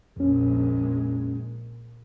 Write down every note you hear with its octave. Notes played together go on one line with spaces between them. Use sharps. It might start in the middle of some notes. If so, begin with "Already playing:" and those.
A#1 F2 G#3 C#4